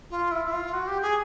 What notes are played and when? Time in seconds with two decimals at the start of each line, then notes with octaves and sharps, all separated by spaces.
0.10 F4
0.31 E4
0.46 E4
0.53 F4
0.73 F#4
0.87 G4
1.02 G#4